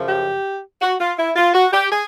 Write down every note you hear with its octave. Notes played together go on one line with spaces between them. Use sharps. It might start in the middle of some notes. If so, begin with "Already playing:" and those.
Already playing: F#2 C#3 F3
G4
F#4
F4
E4
F4
F#4
G4
G#4